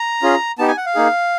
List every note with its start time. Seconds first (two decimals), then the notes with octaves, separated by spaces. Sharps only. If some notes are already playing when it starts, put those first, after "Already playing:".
Already playing: A#5
0.22 C#4 F4 G#4
0.59 B3 D#4 G4 A5
0.68 G#5
0.77 F#5
0.86 F5
0.95 A#3 D#4 G#4